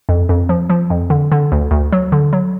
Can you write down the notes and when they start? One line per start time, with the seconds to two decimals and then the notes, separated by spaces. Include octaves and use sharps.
0.09 F2
0.29 F2
0.49 F3
0.70 F3
0.90 F2
1.10 D3
1.32 D3
1.52 D2
1.71 D2
1.92 F#3
2.12 D3
2.33 F#3